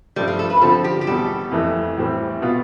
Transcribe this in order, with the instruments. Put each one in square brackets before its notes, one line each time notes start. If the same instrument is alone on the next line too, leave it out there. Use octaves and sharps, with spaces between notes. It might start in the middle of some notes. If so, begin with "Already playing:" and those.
[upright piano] G2 F3 A3 [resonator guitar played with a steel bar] G3
[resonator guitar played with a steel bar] F4
A4
B4
[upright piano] D3 F3 C4 F4 [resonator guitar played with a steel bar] A4
[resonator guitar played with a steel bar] G4
G4
[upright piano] E2 B2 G3 [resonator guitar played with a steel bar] A4
[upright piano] F2 E3 A3
A2 E3 G3 C4
B2 B3 F4